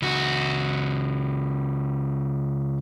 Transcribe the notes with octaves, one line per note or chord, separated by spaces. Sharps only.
C#2 F#4